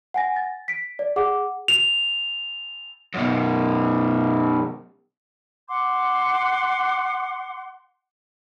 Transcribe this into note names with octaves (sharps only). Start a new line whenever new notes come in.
F#5 G#5 A#6
A6
B6 D7
D5
G#4 F#5 D6
F7
F#2 B2
F#5 C6 D6